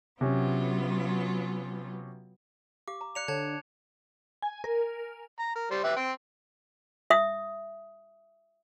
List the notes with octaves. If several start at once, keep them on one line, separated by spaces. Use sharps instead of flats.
C3 F#3 B3 C#4 F4
G4 F5 D6
A#5
D5 F5 A#5 F#6 C#7 F7
D3 C#5 A5 G#6
G#5
A#4
A#5
A#4
G3 C5
G4 B4 E5
C4 G5
E5 D#6